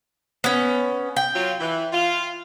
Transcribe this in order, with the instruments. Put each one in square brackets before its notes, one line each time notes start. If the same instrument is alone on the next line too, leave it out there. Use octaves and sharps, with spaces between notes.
[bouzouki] B3 C#4
G5
[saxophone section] F#3 F4
E3
F4